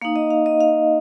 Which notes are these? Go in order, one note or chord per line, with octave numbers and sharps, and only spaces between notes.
A#3 D#4 F5
D#5
F5
D#5
F5